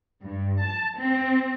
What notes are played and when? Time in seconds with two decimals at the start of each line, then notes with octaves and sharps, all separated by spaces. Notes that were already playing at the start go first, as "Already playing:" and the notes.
0.21 G2
0.62 A5
0.97 C4